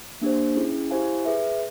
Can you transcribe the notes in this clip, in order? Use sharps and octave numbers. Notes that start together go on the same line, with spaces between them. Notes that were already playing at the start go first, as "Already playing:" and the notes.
A#3 D4 G4 C5
C#4 E4 G#4
E4 G4 C5 F5 G#5
G#4 B4 E5